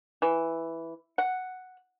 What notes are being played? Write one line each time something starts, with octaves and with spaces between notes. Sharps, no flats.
E3
F#5